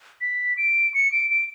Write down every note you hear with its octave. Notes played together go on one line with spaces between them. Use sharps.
B6
D7
C#7
D7
D7